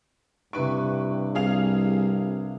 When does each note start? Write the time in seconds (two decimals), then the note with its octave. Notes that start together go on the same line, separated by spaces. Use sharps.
0.53 G2 C3 E4 B4 C#6 D7
1.35 C2 G#4 F5 F7